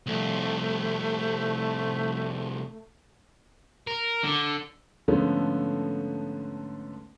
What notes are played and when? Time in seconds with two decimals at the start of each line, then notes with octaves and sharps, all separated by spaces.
0.07 C2 F2 A3
3.87 A#4
4.23 D3
5.08 G#2 D3 F3 A3 B3 C#4